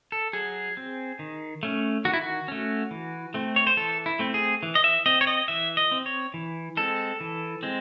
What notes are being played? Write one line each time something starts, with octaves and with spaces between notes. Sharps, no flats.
A4
F#3 G#4
C4
D#3
A3 C#4
D#3 F#4
E4
F#4
A3 C#4
E3
A3 C4
C#5
C5
E3 A4
E4
A3 C4
G#4
E3
D#5
E5
C4 D#5
C#5
D#5
E3 E5
D#5
C4
C#5
E3
G#3 C4 A4
E3
G#3 C4